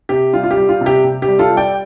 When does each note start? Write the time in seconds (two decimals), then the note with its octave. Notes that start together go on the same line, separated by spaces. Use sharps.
0.09 C3 G4
0.33 G3 F4
0.43 F4
0.51 G4
0.57 G3
0.69 F4
0.81 C3
0.86 G4
1.04 C3
1.22 G4
1.28 G3
1.39 F4 A4
1.52 G3
1.57 D5 G5